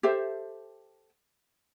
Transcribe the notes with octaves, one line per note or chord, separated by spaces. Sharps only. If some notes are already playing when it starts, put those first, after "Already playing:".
G4 A4 C5 E5